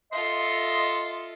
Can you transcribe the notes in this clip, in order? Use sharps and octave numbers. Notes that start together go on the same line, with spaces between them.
F4 A4 D#5 E5 C6